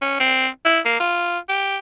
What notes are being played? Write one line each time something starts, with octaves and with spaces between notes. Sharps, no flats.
C#4
C4
E4
A#3
F4
G4